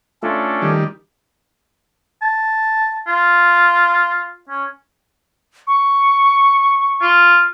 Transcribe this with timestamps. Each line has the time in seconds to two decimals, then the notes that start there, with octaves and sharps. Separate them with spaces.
0.23 A3 C#4 D4 F4 A4
0.62 D#3 G3
2.22 A5
3.07 F4
4.49 C#4
5.67 C#6
7.02 F4